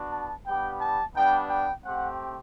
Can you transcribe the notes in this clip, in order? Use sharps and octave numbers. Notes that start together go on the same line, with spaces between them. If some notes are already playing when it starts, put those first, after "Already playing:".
Already playing: B3 D4 F#4
A5
G3 B3 D4 G4 G5
A5
G3 B3 D4 G5
G5
A3 C4 G4 F#5